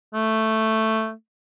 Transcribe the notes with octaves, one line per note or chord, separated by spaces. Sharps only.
A3